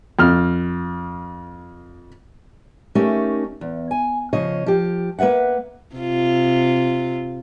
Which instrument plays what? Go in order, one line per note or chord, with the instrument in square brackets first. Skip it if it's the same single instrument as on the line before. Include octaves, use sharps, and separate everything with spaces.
[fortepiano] F2 F6
[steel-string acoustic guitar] A3 C#4 D#4 G4 A#4
E2
G#5
C#3 F3 C#5 D#5
F3 G4
A#3 B4 D5 E5 F#5
[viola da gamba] C3 F4